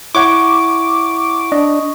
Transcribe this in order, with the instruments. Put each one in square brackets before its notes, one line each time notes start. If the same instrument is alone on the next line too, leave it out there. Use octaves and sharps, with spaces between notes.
[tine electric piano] E4 C#5 F#5 [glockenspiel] C#6 [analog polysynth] D6
[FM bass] D4 [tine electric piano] D#5